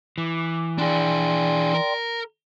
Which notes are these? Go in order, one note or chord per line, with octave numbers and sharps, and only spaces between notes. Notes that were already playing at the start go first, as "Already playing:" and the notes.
E3 D6
D4 G#4 D5 G5 C6
A#4